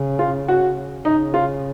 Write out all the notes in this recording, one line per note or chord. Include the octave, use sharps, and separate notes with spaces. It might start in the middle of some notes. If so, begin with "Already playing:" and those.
Already playing: C#3
F4
F#4
C#3 D#4
F4